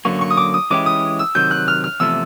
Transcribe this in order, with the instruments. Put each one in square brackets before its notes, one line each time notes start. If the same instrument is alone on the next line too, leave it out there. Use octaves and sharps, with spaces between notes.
[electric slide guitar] F#2 D3 F#3 A#3 [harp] C#6
[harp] C#6
D#6
D6
D#6
[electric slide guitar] E3 G#3 C#4 E4 G4 [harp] D6
[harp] D#6
E6
[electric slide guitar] C3 D#3 F#3 [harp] G6
[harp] F#6
F6
F6
[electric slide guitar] E2 C3 F3 A3 [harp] E6